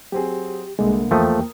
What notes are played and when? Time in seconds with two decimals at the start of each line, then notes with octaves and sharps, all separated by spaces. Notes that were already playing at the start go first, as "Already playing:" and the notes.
0.12 F#3 C4 G4 G#4
0.79 C2 D3 G#3 A#3
1.11 E2 F3 A3 A#4 G5 D#6